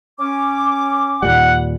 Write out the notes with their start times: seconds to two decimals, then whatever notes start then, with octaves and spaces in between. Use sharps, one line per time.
0.20 C#4 D6
1.23 D#2 A#2 G3 F#5